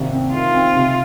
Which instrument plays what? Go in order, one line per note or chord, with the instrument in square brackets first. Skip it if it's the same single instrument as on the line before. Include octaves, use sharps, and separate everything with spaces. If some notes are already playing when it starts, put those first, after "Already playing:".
Already playing: [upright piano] G#1 C3
C4
[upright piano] D#3 [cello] F4
[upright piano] C4
C3